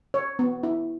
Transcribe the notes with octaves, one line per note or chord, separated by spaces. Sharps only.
C#5
B3
E4